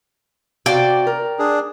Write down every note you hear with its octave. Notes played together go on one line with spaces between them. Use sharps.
C3 F#4 D5 F5 G5
A#4
D4 G#4